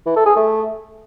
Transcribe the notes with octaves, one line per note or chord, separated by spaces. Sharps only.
E3
A4
G#4
A3